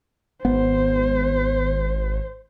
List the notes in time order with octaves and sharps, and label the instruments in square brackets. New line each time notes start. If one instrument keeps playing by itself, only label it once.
[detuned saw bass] G#1 [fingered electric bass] B3 [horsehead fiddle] C5